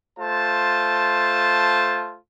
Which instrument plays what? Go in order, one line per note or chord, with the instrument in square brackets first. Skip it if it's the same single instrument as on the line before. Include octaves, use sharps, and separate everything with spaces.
[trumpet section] A3 F4 C5 A5